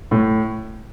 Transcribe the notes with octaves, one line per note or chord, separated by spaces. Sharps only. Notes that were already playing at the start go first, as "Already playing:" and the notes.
A2